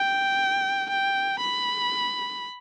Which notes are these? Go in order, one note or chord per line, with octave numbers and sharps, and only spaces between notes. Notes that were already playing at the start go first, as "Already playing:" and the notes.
Already playing: G5
G5
B5